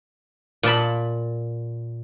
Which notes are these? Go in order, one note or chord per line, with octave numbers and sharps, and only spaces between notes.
A#2 D#5 A5 B5